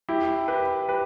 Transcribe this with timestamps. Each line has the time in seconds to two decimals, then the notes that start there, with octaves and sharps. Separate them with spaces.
0.09 E4 G4
0.48 G4 B4
0.89 G4 B4